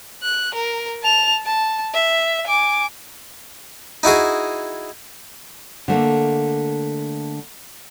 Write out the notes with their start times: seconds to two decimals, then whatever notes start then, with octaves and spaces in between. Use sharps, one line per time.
0.23 F#6
0.54 A#4
1.03 A5 F7
1.46 A5
1.94 E5
2.47 G#5 D6
4.03 D#4 E4 F#4 G#4
5.88 D3 A3 A#3